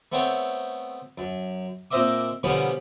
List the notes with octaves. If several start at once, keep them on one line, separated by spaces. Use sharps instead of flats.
A3 B3 C4 C5 C#5 G5
F#2
A#2 C4 C5 D#5 E5 D6
B2 D3 F3 G3 B3 C#4